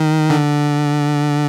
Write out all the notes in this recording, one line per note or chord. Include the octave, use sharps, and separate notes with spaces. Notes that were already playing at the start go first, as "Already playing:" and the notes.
Already playing: D#3
D3